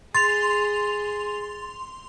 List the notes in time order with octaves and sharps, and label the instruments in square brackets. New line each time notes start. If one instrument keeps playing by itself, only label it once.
[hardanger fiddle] G#4 [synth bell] C6 F7 [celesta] A6